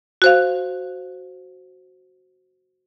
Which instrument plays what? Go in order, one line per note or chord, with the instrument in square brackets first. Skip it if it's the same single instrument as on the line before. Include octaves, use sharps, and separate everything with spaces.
[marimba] F#4 C5 F5